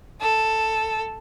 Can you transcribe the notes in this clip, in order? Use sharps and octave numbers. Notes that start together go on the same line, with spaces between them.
A4